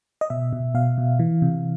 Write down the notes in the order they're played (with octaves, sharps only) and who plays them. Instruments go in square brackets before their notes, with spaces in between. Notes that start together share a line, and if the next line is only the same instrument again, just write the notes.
[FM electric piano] D#5
B2 E5
B2
B2 F5
B2
E3
C3